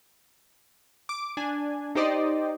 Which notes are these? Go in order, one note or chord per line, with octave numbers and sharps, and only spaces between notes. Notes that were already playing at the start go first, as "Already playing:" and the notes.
D6
D4 G#5
D#4 G4 C5 D5 D#5